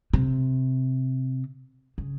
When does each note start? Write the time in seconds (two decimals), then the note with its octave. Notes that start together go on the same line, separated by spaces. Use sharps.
0.13 C3
1.98 C#3